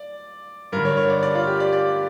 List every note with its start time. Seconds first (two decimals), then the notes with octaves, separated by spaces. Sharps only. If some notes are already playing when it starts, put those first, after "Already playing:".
Already playing: D5
0.72 G2 A#4
0.77 D3
0.85 C#5
0.97 C#5
1.10 D5
1.23 D5
1.35 F4
1.47 G4
1.60 D5
1.73 D5